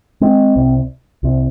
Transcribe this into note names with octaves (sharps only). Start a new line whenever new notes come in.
G#3 C4
C2 C3
C2 C3